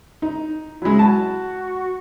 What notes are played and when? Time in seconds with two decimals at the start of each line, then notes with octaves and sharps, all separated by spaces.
0.22 D#4
0.82 F#3 G#3 E4
0.99 F#4 A5